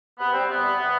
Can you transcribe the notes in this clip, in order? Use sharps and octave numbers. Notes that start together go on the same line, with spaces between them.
C3 B3
G3 C4
C3 B3
G3
C3